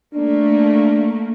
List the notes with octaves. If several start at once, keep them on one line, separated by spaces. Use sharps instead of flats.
A3 A#3 D4